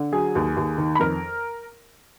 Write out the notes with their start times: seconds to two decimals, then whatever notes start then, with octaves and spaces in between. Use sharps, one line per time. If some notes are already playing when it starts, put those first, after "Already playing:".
Already playing: D3
0.12 F#3 G#4 G#5
0.35 D#2
0.57 D#2
0.78 D#3
0.95 B5
1.00 F2 A#4 A#5